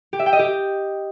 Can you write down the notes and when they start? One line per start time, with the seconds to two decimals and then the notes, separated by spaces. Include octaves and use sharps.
0.13 G4
0.19 E5
0.26 G5
0.33 D#5
0.39 G4